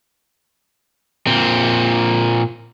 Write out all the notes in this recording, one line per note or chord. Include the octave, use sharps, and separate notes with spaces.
A#2 C4